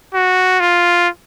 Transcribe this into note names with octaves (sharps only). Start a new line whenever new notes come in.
F#4
F4